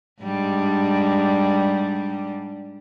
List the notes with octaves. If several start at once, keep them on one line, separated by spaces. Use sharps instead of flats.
G#2 G3 D4